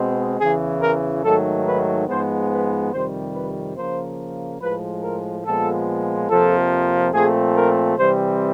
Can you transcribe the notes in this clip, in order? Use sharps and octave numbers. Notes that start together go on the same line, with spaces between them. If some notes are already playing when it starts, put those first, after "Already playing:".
Already playing: B2 G#3 C4
E2 C#3 E3 G#4
A#4
G#2 D#3 F#3 A3 A4
B4
G#2 F3 G#3 B3 C5
B4
F2 C3 D#3 G3 C5
B4
C#3 F3 A#3 C5
A2 F3 G#3 B4
A#4
A#2 F3 G#3 B3 A4
F2 C3 F3 A#3 A4
A#2 F3 A3 C4 G#4
A#4
C3 E3 G3 C4 C5